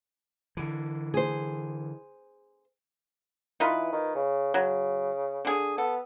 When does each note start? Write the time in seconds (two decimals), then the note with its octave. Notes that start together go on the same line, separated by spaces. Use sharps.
0.57 D3 E3
1.14 G#4 C5
3.60 E3 D#4 F4 B4
3.93 D#3
4.15 C#3
4.54 C#3 F#3
5.45 D3 G#4
5.78 B3 A4